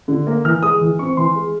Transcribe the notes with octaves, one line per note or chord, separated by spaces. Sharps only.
D3
A#3
E3 F6
G#3 D#6
E3
C4 C#6
E3 C6
G#3